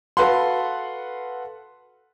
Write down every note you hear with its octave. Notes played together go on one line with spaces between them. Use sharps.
F#4 A4 B4 F5 F#5 C6